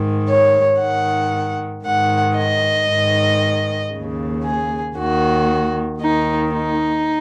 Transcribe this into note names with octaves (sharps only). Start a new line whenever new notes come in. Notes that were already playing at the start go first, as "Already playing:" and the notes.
Already playing: G#2 D#3
C#5
G#2 D#3 F#5
G#2 D#3 F#5
D#5
G#2 D#3
D#2 C#3
G#4
D#2 D#3 F#4
D#2 D#3 D#4
D#4